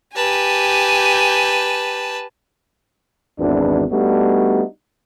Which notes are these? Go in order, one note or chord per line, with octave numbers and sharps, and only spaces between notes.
G4 B4 G#5 A5
G#1 E2 D4
G3 A3 B3 D4 D#4 F#4